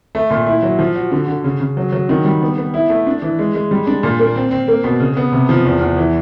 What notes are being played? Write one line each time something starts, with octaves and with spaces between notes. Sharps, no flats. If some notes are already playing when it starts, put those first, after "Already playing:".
A3
A#2
E4
F#3
F3
F#4
D3
D3
C#3
C#3
F#3
F#3
D#3
G3
B3
B3
E4
A3
D4
E3
G#3
G#3
G3
D4
A#2
A#3
C4
C4
A#3
B2
C#3
B3
C3
F3
E2
E2
E3